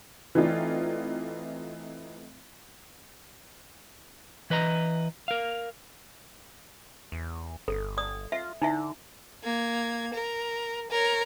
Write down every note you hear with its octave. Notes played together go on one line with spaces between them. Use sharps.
E3 A3 C4 D#4 F4 D5
E3 B4 D#5 A#5
A#4 F5
E2
G1 A4
D5 D#6
F4 E5
D3 D#4 E4 E5
A#3 G#6
A#4
A#4 C#5